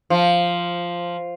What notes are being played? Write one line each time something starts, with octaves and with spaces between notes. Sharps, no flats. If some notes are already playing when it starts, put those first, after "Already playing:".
F3